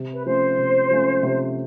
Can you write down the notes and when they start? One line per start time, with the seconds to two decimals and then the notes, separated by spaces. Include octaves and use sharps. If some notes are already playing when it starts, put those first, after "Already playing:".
Already playing: C3
0.15 B4
0.25 F3 A3 C#4 C5
0.58 C3
0.90 F3 A3 C#4
1.23 C3